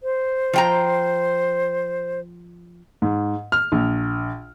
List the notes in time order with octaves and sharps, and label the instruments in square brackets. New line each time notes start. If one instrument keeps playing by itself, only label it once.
[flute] C5
[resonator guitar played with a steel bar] F3 G5 A#5
[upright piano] G#2
F6
A#1